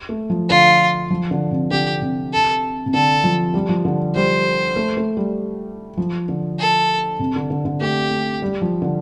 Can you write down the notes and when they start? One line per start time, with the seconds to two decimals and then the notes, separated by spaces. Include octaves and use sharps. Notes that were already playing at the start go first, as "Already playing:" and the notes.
0.09 A3
0.30 F3
0.49 D3 F4
1.11 F3
1.31 D3
1.51 C3
1.71 D3 G4
2.02 C3
2.33 A4
2.86 C3
2.94 D3 A4
3.24 F3
3.54 G3
3.69 F3
3.85 D3
4.15 G3 C5
4.76 A3
4.97 A3
5.17 G3
5.97 F3
6.28 D3
6.59 A4
7.19 C3
7.36 D3
7.50 D3
7.65 D3
7.80 A3 G4
8.11 A3
8.42 G3
8.61 F3
8.82 D3